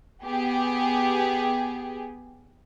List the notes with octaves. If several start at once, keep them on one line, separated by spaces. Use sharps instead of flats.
B3 G4 G#4